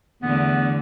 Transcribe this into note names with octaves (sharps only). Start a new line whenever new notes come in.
E2 D3 A3 B3